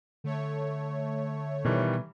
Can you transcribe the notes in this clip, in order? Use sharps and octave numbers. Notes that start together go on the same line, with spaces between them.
D3 A3 C#5
B2 D#3 E3 G3